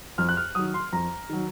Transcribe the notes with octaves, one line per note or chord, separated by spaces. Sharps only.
F2 F6
F#6
F6
D#3 F#3 D#6
C6
F2 A#5
D#3 F#3